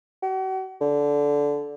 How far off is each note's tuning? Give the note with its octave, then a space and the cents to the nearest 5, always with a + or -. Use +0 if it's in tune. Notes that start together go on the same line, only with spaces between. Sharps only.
F#4 +40
D3 -15